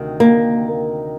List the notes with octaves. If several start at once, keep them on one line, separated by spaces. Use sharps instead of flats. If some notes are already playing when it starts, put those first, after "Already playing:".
Already playing: D2 C3 D#3
A#3